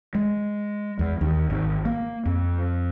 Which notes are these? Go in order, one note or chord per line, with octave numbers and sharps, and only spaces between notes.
G#3
E2
D#2
G#1
A#3
F2